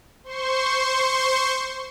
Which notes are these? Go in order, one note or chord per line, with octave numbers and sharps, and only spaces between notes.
C5 C6 C#6